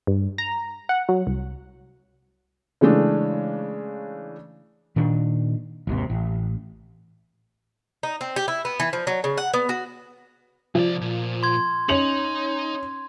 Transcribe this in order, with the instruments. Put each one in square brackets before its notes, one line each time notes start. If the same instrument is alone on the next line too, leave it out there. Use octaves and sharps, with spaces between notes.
[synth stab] G2
A#5
F#5
F#3
C2
[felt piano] C#3 E3 G#3 A3 D4
[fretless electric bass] A#2 D#3 D4
G#1 D#2 C3
A1
[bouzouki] D#4
C4
G4
E4
B3
E3
F3
F#3
C#3
F#5
B3
F#4
[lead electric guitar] C2 D5 [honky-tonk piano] F3
[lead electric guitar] A#2
[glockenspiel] C6 G#6
[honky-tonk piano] C#4 F7 F#7 [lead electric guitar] D#4